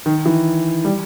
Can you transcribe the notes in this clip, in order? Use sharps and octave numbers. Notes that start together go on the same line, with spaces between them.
D#3
E3
G3